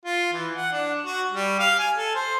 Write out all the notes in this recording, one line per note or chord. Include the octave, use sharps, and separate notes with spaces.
F4
E3
F#5
D4
F#4
G3
F5
G#5
A4
C5